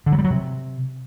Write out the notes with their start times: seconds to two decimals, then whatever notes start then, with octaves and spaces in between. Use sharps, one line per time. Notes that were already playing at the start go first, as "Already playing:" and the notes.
0.06 D3
0.12 F#3
0.18 G3
0.24 F#3
0.30 C3